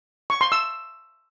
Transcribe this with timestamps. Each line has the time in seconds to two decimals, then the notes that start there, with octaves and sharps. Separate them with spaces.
0.30 C#6
0.41 C6
0.52 E6